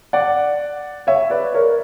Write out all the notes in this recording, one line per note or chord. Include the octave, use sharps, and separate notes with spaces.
D5 F#5
C#5 E5
B4 D5
A#4 C#5